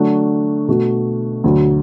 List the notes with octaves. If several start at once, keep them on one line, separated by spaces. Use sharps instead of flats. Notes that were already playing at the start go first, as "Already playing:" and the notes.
Already playing: D3 F#3 A3 D4 F#4
B2 A3 F#4
D2 D3 F#3